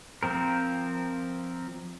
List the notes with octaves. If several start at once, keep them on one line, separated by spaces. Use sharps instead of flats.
F3 C4 A#4